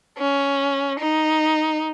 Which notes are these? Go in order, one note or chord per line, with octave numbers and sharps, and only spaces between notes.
C#4
D#4